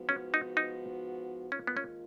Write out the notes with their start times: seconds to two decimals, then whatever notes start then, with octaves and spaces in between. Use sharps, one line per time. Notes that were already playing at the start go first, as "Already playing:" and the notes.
Already playing: G#2 F3 B3 F#4
0.09 C#4
0.34 D#4
0.57 D#4
1.52 G#2 D#3 A#3 C#4 F4
1.67 B3
1.77 C#4